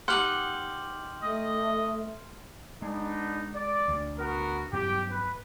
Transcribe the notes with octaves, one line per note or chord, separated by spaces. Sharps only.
D#4 G4 F#5 C6 F6 F#7
A3 D#5
G#3 B3 D4 D#4
D5
D2
B3 F#4 A#4
G2 F#3 B3 G4
B4